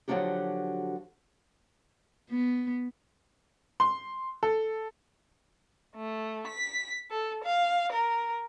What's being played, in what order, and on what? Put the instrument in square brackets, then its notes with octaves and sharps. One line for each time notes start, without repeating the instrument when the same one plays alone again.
[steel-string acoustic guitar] D3 F3 F#3 D4 F#4 G4
[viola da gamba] B3
[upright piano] C6
A4
[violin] A3
B6
A4
F5
A#4